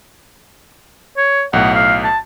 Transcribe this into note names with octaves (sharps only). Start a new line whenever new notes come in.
C#5
B1 A2 F#5
F5
A5